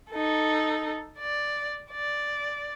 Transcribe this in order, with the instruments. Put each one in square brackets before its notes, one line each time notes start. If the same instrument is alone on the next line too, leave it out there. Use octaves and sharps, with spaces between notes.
[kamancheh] D#4 A4
D5
D5